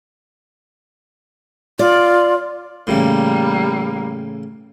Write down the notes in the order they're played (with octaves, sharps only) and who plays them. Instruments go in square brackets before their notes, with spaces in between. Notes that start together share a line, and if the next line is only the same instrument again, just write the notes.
[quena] F4 [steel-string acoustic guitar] D5
[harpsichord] A2 C#3 E3 [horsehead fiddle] G3 A#3